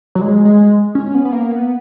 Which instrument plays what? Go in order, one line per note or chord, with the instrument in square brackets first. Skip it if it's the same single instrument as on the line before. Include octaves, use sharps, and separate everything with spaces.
[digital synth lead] F#3
G#3
G#3
C#4
B3
B3
A#3
B3